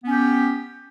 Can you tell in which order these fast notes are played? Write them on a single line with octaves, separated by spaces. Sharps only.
B3 C#4 G4